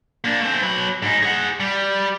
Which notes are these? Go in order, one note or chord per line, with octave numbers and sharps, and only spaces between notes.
A#3 D4
A3 C4
F#3 B4
G#2 D#4
G#4 F#5
G3